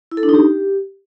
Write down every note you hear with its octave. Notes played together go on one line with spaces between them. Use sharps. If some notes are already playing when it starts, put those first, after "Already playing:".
E4
A4
D4
D#4
G4